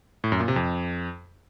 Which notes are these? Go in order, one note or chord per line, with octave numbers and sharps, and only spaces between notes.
A2
F#2
A#2
C3
F2